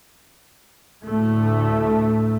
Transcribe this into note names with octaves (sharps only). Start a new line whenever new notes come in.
D2 A2 A3